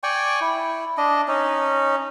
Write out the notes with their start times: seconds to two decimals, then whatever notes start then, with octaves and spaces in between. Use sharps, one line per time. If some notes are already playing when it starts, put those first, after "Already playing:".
0.03 D5 G5 G#5 C#6
0.41 E4
0.97 D4 D#5
1.28 C#4 D#4